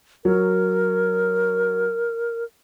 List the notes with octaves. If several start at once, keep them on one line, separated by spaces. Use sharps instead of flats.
F#3 A#4